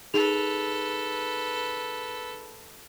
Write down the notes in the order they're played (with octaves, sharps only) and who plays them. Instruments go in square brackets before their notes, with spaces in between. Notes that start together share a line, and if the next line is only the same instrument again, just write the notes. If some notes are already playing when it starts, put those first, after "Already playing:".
[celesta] D#4 G#4 F7 [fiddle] A4 B4